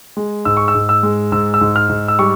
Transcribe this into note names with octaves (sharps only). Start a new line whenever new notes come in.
G#3
G#2 E6
C#6
E6
G#2
E6
G#3
G#2 E6
E6
G#2
F6
G#2
E6
G3 C#6